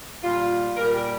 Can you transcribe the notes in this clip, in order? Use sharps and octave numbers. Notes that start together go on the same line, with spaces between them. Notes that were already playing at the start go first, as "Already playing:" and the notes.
A#2 G3 F4
A#2 G3 A#4
G4